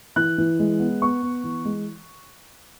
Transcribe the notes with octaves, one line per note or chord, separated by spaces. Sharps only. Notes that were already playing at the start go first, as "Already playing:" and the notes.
E3 F#6
E3
G#3
B3
B3 C#6
B3
E3
G#3